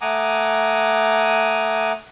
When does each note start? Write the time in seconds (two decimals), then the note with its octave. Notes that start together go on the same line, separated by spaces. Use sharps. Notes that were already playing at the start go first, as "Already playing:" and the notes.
0.01 A3 F#5 G#5 A#5 D6 D#6